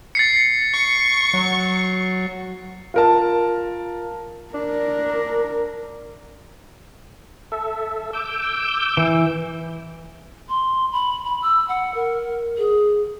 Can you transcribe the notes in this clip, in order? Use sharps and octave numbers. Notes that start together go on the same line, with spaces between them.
A6 C7 C#7
C#6
F#3
F4 A#4 A5
D4 A#4
A4 E5
D6 E6 G6
E3
C6
B5
B5
E6
F#5
A#4
G#4